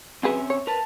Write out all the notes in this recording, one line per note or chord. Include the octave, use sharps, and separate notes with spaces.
F#3 C4 C#4 G#4 B4 E5
C#5
A#4 B4 A5